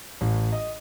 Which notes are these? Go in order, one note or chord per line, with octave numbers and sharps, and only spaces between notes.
A1
D#5